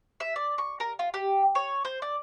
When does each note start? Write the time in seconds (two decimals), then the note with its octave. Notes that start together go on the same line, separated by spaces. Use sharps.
0.20 E5
0.36 D5
0.58 C#6
0.80 A#4
0.99 F4
1.14 G4
1.55 C#5
1.85 C5
2.02 D5